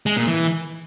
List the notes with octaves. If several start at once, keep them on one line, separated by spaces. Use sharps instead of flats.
G#3
A#2
E3